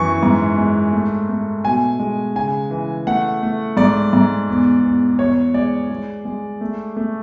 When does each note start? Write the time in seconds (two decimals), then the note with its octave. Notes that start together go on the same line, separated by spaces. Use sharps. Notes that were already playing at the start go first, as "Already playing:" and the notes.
Already playing: F#2 E3 C#6
0.23 G#2
0.58 G#3
0.93 A3
1.29 A3
1.64 B2 G#5
1.99 G#3
2.36 C#3 G#5
2.70 E3
3.07 A3 F#5
3.42 A3
3.77 G#2 D5
4.13 G#2
4.49 E2
4.84 E2
5.19 E2 C#5
5.54 G#3 D5
5.90 G#3
6.25 G#3
6.61 A3
6.97 A3